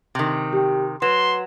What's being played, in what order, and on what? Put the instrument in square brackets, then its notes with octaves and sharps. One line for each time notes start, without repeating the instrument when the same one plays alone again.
[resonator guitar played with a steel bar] C3 D#3
[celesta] G4 G5
[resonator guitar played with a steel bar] F#3 [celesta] B4 E7 [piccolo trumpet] C6